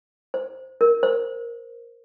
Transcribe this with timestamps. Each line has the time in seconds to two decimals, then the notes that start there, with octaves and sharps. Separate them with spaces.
0.34 C5
0.81 A#4
1.03 C5